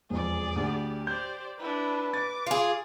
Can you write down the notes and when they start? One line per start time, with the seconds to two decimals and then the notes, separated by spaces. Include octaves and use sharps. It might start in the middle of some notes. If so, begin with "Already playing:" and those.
0.10 E1 F2 G#4 D5
0.56 D2 G4
1.07 C5 D5 G6
1.59 D4 E4 B4
2.13 D6 A6
2.47 F4 G#4